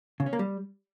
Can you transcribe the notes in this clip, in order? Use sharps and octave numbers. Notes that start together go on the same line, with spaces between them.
C#3
C#4
A#3
G3